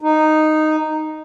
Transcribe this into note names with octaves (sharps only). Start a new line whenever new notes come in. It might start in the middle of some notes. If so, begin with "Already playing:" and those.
D#4